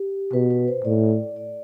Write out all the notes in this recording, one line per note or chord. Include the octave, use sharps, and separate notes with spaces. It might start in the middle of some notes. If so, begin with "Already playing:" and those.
Already playing: G4
B2 B4
B4
C5
A2 D5
D5